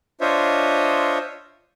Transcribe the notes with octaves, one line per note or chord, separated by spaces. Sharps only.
D4 F4 C5 C#5 D#5 E5